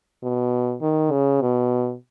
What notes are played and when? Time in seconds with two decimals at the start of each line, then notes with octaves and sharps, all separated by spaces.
0.23 B2
0.82 D#3
1.11 C#3
1.41 B2